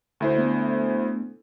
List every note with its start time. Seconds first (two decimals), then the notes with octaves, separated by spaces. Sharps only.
0.20 D2 E4 C5
0.36 A3 B3 D4